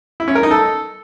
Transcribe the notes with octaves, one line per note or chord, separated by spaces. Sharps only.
E4
C#4
A#4
D#4
A4